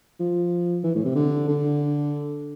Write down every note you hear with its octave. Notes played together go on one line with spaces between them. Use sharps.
F3
E3
A2
C3
D3
D3